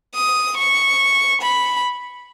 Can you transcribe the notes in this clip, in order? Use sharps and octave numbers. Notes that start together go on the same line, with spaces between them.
D#6
C#6
B5